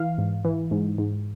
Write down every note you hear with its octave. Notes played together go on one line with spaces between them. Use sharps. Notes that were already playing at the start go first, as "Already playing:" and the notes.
Already playing: E3 F5
G#2
E3
G#2
G#2